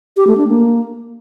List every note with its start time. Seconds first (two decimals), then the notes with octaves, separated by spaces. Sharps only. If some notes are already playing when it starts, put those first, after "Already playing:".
0.17 G4
0.27 A3
0.38 D4
0.48 A#3